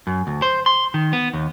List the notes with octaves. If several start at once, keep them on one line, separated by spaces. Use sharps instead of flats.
F#2
D2
C5
C6
D#3
B3
D#2